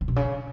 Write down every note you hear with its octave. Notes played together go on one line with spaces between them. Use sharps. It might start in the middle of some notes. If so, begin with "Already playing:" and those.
C#3
B2
C#3